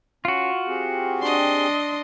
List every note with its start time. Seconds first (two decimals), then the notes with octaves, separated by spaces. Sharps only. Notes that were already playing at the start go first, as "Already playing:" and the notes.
0.25 C#4 F4 F#4
0.67 C4 G4 G#4
1.22 D4 D#5 C6